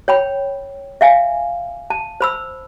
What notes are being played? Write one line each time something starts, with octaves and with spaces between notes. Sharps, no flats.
C#5 G5 B5
E5 F5 G#5
A5
C5 B5 E6